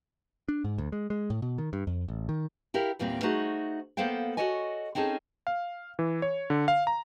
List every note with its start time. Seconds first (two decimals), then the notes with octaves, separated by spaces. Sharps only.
0.49 D4
0.64 G#2
0.78 D2
0.92 G#3
1.10 G#3
1.30 A2
1.42 B2
1.58 D#3
1.73 G2
1.87 F2
2.08 A1
2.29 D#3
2.74 E4 G4 A#4 F5
2.99 E2 A#2 G3 A#3 C4
3.23 A3 D#4 F#4 G#4 C5 F#5
3.97 A#3 B3 A4 C5 F5 G5
4.37 F#4 G4 A4 C#5 D#5 G#5
4.95 C4 C#4 D#4 G#4 A4
5.47 F5
5.99 E3
6.22 C#5
6.50 D3
6.68 F5
6.87 A#5